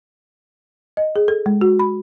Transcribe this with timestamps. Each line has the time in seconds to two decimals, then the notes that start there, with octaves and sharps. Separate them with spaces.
0.97 D#5
1.16 G#4
1.28 A4
1.46 G#3
1.61 F#4
1.79 B5